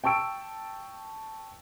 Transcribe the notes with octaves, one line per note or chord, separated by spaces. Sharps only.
G5 A5 C#6 E6 D7